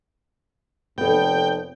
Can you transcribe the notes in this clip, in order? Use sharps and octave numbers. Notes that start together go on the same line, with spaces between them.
F1 B3 A4 G5